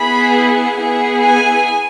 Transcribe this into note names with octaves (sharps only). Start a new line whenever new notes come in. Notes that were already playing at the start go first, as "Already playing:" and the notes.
Already playing: B3 E4 G#4 B5
B3 E4 G#4
G#5